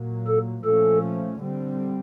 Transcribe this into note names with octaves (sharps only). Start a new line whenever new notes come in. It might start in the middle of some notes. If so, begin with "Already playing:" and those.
Already playing: A#2 F#3 A#3
A4
A#2 F3 A3 C#4 A4
D3 G3 C4